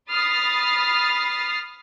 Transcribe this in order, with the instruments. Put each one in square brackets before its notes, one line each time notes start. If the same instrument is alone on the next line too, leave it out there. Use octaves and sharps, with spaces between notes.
[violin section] B5 D#6 F6 A6 C7